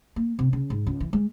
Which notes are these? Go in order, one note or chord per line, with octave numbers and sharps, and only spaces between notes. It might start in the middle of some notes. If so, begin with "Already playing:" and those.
A#3
C3
C#3
G#2
C#2
E3
G#3